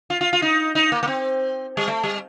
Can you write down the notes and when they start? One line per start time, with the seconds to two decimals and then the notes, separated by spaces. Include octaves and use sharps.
0.10 F4
0.21 F4
0.33 F4
0.42 D#4
0.75 D#4
0.92 A#3
1.03 A#3
1.07 C4
1.77 G3
1.88 A3
2.03 G3